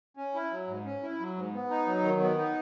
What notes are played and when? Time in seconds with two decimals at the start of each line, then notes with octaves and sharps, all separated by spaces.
0.17 C#4
0.35 E4
0.51 F#3
0.68 G#2
0.85 C#4
1.03 E4
1.20 F#3
1.36 G#2
1.53 B3
1.70 D#4
1.87 F#3
2.03 D#3
2.20 B3
2.38 D#4